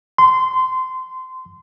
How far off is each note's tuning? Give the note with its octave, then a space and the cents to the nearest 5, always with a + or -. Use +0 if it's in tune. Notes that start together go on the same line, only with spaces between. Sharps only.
C6 -20